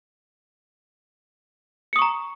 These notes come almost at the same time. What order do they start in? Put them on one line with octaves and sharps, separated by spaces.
C#7 D#6 C#6 A#5